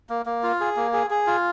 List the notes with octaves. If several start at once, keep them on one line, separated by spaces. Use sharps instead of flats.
A#3
A#3
F4
G#4
A#3
G#4
G#4
F4